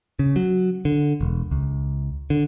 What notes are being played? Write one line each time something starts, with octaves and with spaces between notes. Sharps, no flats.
C#3
F#3
D3
E1
C#2
D3